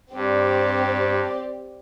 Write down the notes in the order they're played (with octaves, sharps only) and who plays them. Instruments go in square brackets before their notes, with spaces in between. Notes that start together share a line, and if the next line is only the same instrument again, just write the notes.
[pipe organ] G2 [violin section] C4 G4 D5